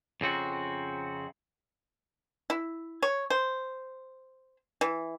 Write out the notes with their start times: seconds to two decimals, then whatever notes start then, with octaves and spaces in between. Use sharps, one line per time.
0.21 F2 C#3 C4 F#4
2.50 E4
3.02 C#5
3.30 C5
4.81 E3